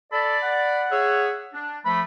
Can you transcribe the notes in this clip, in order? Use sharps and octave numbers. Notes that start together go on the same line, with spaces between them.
A4 D5 B5
F#5
G#4 C#5 E5
D4
F3 A3 B5